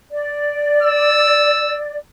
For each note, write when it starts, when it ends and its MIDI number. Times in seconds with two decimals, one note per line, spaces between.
0.11 1.97 74
0.83 1.78 88